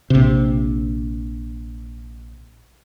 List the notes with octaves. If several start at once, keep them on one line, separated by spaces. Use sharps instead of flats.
A#1 C3